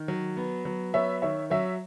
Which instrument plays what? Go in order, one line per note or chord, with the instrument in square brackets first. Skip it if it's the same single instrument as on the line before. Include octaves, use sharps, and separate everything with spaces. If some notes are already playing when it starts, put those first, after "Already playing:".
Already playing: [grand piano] D#3
F#3
B3
F#3
[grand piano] B3 [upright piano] C#5 E5
[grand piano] D#3 [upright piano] C#5 E5
[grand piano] F#3 [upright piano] C#5 E5